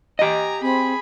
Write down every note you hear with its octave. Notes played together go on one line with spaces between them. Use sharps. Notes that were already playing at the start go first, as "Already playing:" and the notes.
G4 D#5 G#5 A#5
C4 G#4 B5